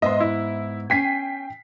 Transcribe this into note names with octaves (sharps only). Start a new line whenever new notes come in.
G#2 B3 D#5 E5 C6
E4
C#4 G5 G#5 B6 C7